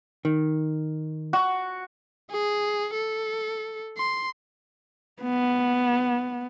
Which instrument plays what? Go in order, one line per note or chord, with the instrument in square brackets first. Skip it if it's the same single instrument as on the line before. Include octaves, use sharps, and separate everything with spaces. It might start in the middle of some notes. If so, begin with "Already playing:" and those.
[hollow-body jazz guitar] D#3
[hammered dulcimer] F#4
[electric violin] G#4
A4
C6
[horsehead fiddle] B3